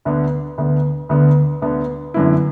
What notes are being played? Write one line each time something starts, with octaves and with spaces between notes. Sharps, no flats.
D2 D3 B3
D2 D3 B3
D2 D3 B3
D2 D3 B3
F#2 D3 B3 E4